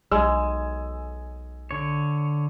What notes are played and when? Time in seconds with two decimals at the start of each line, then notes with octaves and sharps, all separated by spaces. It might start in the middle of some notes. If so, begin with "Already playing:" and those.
0.11 B1 G#3 G#5 E6
1.71 D3 C#5